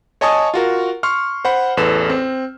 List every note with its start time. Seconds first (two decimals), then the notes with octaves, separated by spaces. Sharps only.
0.21 C#5 D#5 G#5 A5 C#6 D#6
0.54 F4 F#4 A#4
1.03 C6 C#6 F6
1.45 C5 F#5 B5
1.77 A1 E2 A4 B4 E7
2.10 C4